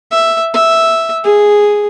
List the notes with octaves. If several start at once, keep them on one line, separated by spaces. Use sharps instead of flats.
E5
E5
G#4